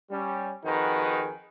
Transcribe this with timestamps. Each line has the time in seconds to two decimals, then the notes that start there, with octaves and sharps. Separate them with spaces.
0.10 G3 C#4
0.64 F2 D#3 D#4 F#4 G#4 B4